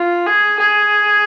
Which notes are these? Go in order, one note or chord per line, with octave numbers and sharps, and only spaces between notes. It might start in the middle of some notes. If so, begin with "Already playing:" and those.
Already playing: F4
G#4
G#4